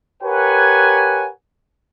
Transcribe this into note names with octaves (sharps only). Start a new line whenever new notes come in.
G4 A#4 B4 C#5 F#5 G#5